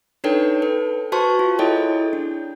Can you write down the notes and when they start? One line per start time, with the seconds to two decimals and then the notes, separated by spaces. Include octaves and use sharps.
0.24 D4 D#4 A4 B4 C#5 G5
0.62 A4 B4
1.12 F#4 B4 C5 A5 C6 C#6
1.39 F4
1.59 E4 G#4 A4 C#5 D#5 G5
2.13 D4